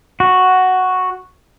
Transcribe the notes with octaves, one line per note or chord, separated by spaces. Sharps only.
F#4